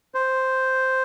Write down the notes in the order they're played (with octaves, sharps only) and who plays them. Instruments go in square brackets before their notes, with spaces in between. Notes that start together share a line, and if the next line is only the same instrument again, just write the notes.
[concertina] C5